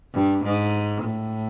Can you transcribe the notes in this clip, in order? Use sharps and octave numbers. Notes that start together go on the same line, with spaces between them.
G2
G#2
A2